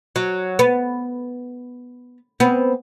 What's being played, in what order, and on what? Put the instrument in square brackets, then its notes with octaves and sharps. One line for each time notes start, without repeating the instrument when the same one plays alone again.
[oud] F#3
B3
B3 C4